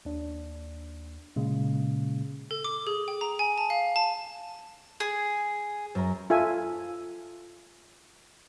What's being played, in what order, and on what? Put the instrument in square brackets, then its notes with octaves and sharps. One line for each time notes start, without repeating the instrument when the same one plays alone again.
[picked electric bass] D#2 D4
A#2 C#3 G#3
[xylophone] A4
D6
G#4
G5
A#5
G#5
A5
F5
A5
[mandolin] G#4
[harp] F#2 A#5
[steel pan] F4 A4 E5 G#5